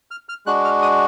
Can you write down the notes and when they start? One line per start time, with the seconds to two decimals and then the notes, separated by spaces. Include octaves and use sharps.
0.11 F6
0.29 F6
0.46 G#3 D4 F#4 F#6
0.65 F6
0.82 D#6